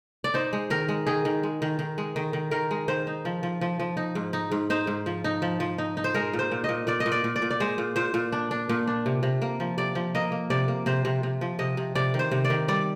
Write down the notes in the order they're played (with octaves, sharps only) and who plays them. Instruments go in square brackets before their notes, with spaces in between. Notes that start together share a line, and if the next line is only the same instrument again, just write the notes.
[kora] D5
D#4 C5
G#3
D#3 A#4
G#3
D#3 G#4
D#3
G#3
D#3
D#3
G#3
D#3
D#3
D#3 A#4
G#3
D#3 C5
D#4
F3
F3
F3
F3
D#4
G#2
D#4
G#2
D#4 C5
G#2
F3
D#4
F3
F3
D#4
D#4
C5
G#3 A#4
A#2
C5
A#2
A#2 D#5
A#2 D5
D#5
A#2
D5
A#2
D5
A#2
D5
G#3 C5
A#2
A#2 C5
A#2
D4
D4
A#2
D4
C3
C3
A#3
F3
C3 D5
F3
A#3 D#5
A#3
C3 D5
A#3
C3 C5
C3
C3
F3
C3 D#5
C3
C3 D5
D#3
C5
C3
D5
D#3
G3 D5